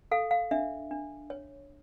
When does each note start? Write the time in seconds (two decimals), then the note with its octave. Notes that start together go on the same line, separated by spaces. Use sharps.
0.11 A4 F5
0.31 F5
0.51 D4 E5
0.91 D4
1.30 C#5